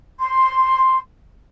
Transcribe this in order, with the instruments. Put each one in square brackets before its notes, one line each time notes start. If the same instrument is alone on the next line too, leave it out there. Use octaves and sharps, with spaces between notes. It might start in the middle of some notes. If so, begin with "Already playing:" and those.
[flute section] C6